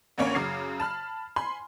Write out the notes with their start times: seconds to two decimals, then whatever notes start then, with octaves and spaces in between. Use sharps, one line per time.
0.18 A1 D2 A#3 C#4 C#5
0.35 F#2 C#3 D6 G#6 C7
0.80 A5 B5 F6
1.36 G#5 B5 C6